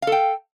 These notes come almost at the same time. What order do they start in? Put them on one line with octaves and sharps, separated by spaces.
F5 A4 G5